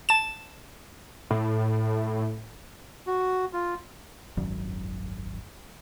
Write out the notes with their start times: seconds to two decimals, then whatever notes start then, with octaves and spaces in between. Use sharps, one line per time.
0.09 A5 E7
1.31 A2
3.07 F#4
3.53 F4
4.37 D#1 G#1 F#2 F#3